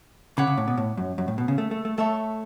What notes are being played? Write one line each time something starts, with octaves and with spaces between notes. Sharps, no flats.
C#3 C#5 F#5 B5 D6
C#3
A2
B2
A2
F#2
F#2
A2
B2
C#3
A3
A3
A3
A3 A4 C#5 E5 A5